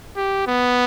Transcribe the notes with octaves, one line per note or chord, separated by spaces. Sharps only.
G4
B3